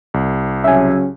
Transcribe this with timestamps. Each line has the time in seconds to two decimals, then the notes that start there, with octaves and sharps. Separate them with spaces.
0.14 C2
0.64 C#3 F#3 C#4 E5 G#5